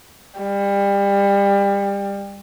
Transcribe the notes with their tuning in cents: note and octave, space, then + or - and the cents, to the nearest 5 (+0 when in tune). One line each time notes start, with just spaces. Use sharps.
G3 +30